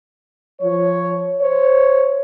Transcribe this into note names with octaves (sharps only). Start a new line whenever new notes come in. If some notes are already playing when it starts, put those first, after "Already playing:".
F3 C#5
C5 C#5